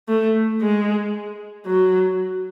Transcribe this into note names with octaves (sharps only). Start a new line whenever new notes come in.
A3
G#3
F#3